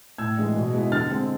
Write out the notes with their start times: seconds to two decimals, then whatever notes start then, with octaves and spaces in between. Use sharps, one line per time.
0.18 A2 E6 G#6
0.37 E3 G#3 D4
0.55 B2
0.74 G#3 B3 E4
0.92 D3 F6 A6
1.10 G#3 C4